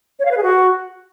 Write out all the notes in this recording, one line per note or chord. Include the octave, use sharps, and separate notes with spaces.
C#5
F5
B4
G#4
F#4